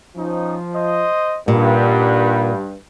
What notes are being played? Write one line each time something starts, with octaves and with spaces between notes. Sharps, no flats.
F3 C#4 D#4
C5 D#5
G2 A#2 D#4 F#5 B5